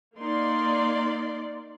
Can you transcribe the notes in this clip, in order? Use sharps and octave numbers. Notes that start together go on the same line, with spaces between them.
A#3 D#4 D5 C6